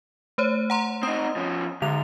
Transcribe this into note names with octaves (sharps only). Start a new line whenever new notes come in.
A3 C5 C#5
F#5 A#5 C6
C4 D#4 D#6
F3 C#4
G#2 D3 F7